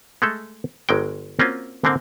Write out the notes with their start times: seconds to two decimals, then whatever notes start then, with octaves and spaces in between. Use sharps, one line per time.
0.22 G#3 A3 A4
0.89 G1 F#3 G#3 G5
1.39 A#3 C4 C#4 F4 F#4
1.84 G#2 D3 A#3 C4